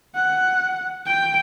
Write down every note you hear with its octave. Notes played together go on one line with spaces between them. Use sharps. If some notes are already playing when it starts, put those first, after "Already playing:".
F#5
G5